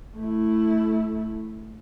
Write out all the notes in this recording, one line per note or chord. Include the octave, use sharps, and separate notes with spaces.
A3 E4